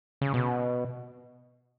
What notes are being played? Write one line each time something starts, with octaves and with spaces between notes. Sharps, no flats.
C#3
B2